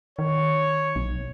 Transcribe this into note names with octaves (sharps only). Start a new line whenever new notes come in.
D#3 C#5
B1